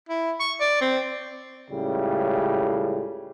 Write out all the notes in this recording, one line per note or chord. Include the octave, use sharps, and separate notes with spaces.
E4
C#6
D5
C4
C#2 A2 C#3 G3